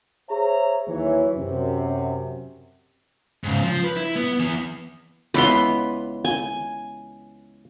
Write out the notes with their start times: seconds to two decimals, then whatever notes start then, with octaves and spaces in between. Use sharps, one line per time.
0.30 G#4 C5 C#5 E5 A#5
0.87 D#2 E3 F#3 C#5
1.36 F#2 C3
3.44 G#2 C#3
3.63 F3
3.84 B4
3.97 E4
4.16 B3
4.40 E3 B3
5.34 C#2 E3 B3 B5 C6
6.25 G#5